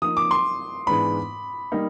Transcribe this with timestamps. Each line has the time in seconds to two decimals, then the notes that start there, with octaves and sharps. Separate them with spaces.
0.02 F3 A#3 D#4 D#6
0.17 D6
0.31 C6
0.86 G#2 E3 G#3 B3 D4 B5
1.72 G3 A#3 D#4